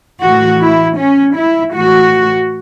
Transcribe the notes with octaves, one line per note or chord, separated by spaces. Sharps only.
A2 E3 F#4
E4
C#4
E4
A2 E3 F#4